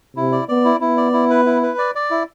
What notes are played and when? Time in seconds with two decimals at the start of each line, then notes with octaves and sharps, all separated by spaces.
0.17 C3 E4
0.32 D5
0.48 B3 D5
0.65 E4
0.81 B3 E4
0.97 D5
1.13 E4
1.30 B4
1.46 E4
1.63 B4
1.78 D5
1.95 D5
2.10 E4